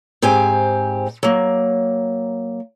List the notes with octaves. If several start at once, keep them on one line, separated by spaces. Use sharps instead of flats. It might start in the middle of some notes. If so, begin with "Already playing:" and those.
G#2 C4 G4 G#5
F#3 A#3